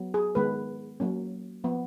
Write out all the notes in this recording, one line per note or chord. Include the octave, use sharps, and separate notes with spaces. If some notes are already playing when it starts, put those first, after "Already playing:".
Already playing: F#3 B3
G#4
D#3 G#3 B3 B4
F#3 A#3 C#4
F3 B3